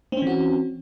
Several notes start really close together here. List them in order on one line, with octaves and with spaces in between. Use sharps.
C4 C#4 E3 F#4